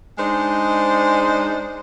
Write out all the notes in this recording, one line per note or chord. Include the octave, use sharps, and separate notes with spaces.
G#3 D4 D#4 C5